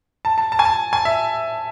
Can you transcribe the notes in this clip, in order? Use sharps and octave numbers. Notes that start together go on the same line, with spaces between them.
A5
A5
A5
G#5
A5
G#5
E5